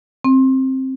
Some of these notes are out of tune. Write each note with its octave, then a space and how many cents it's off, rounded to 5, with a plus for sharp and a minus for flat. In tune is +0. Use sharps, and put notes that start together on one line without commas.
C4 +15